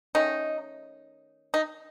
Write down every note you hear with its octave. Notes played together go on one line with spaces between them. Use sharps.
D#3 A3 C#4 D#4
D#4